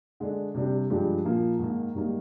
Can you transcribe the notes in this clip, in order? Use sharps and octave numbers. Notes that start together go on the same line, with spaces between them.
D3 G#3 D4
C3 G3 D4 G4
G2 F3 G#3 D4 G4
A#2 F3 A#3
G#2 D#3 A#3
G#2 D#3 G3 A#3